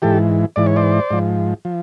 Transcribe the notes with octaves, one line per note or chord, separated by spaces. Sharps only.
G#2 E3 G4 A4
G#2 E3 D5
C#5
C5 D5
G#2 F3
F3